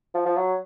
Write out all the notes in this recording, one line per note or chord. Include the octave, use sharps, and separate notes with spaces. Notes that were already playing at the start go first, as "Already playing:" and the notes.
F3
F3
F#3